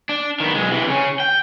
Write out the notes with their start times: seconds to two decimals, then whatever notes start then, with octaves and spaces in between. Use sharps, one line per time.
0.09 D4
0.40 D#3 B3
0.55 B1 G#3
0.71 C3 E3
0.88 C#3 C#4
1.20 G5